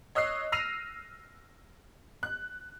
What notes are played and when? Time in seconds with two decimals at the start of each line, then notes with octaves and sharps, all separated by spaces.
0.15 C#5 D#5 E6 F#6 C7
0.52 E6 F6 A#6 C7 D#7 F7
2.23 F#6